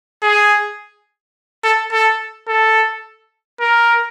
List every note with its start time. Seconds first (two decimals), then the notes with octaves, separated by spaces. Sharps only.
0.23 G#4
1.64 A4
1.92 A4
2.48 A4
3.61 A#4